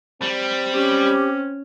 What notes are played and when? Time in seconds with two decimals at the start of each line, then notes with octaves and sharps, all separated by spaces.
0.22 G3 C4
0.72 C#4 G4